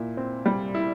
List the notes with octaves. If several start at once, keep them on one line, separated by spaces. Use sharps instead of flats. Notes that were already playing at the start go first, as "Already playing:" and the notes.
Already playing: A#2 E4
C4
G3
E4